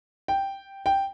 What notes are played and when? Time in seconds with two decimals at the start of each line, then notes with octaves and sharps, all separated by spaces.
0.28 G5
0.86 G5